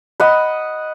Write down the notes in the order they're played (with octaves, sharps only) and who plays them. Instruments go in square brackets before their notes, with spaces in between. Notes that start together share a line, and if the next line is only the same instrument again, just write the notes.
[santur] D#5 F#5 B5